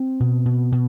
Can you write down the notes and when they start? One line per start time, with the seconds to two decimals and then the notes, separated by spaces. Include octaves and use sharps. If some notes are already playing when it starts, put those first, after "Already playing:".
Already playing: C4
0.20 B2
0.45 B2
0.72 B2